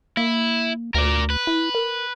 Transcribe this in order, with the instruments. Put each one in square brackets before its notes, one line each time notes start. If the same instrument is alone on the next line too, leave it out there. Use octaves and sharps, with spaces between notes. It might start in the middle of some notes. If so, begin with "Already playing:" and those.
[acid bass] A#3 [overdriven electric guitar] E4
[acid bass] D2 [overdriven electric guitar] A#4 D5
[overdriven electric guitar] B4
[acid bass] E4
A#4